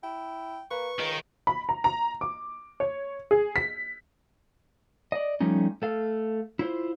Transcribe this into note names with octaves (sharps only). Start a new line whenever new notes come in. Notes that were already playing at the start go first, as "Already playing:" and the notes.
E4 G5
A#3 B4 C#6
C#2 D#3
B5
A#5
A#5
D6
C#5
G#4
B6
D5 D#5
F3 G3 A3 C#4 D#4
A3 A4 F5
E4 F4 C5